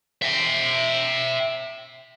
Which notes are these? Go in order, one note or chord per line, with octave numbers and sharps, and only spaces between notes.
E5 G5